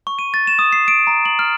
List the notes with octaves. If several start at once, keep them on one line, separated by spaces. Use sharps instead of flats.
C#6
D#7
A6
E7
D#6
C7
D7
A#5
F#7
F6